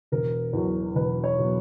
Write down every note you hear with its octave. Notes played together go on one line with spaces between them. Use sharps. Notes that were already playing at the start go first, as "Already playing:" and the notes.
E1 A#4
E2 B2 F#3
E1 B4
C#5
B2 F#3